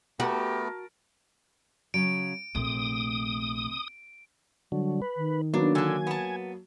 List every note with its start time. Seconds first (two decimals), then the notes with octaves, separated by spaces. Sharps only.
0.20 A3 B3 F#4 G4 A#4 A5
1.94 C#3 F#3 D7
2.55 A#1 C3 A3 D#6
4.72 D3 F#3 G3
5.02 B4
5.17 D#3
5.54 F#3 A#3 B3 D4
5.75 D3 G#5 A5
6.07 B3 A5